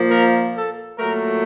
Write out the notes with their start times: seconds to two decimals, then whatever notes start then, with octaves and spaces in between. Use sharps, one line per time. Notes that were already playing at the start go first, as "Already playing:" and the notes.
Already playing: A#2 F3 A#3
0.09 A#4
0.55 A4
0.99 A#2 F#3 A3 A#4